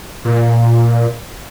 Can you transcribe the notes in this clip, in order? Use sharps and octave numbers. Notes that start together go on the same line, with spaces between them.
A#2